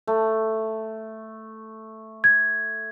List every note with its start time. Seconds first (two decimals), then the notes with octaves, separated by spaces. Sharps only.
0.07 A3
2.24 G#6